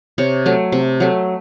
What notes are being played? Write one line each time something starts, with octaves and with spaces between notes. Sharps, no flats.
C3 C#5
F#3 A3
C3
F#3 A3